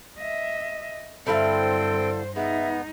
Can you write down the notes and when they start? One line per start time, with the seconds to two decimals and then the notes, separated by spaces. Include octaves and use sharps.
0.18 D#5 E5
1.27 G2 D3 C4 E4 A4 C5 F5 G5
2.36 G#3 B3 D#4 E5